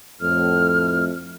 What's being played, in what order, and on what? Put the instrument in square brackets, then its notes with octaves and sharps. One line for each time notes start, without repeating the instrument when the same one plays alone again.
[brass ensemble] F2 A2 A3 [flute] F6